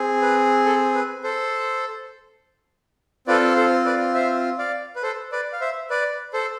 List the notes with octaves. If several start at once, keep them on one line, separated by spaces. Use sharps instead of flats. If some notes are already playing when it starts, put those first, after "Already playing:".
Already playing: C4 G#4
B4
A4
B4
A4 C5
C4 F4 A4 B4 D5
A4 C5
B4 D5
C5 E5
D5 F5
B4
A4 C5
B4 D5
F5
C5 E5
B4 D5
A4 C5